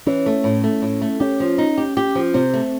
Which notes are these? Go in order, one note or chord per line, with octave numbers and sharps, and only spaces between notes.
E3 C#4
A3
A2
A3
A2
A3
C#4 G4
F3
D#4
G4
G4
F3
C3 C4
A3